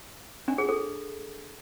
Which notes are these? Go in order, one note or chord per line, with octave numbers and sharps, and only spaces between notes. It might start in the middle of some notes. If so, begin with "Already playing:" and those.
D4
G#4
A4